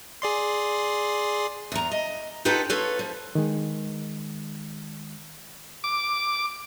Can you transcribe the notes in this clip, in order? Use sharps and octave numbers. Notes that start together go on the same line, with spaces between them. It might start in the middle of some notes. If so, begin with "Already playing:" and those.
G#4 D5 C6
E2 A#5
D#5
D#4 F4 G4 A4 B4 F#5
F4 A4 B4 C#5
F3
D#3 G#3
D6